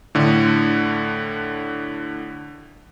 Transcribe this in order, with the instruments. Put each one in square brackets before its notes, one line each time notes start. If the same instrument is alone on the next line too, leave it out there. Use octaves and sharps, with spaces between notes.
[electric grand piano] A2 D3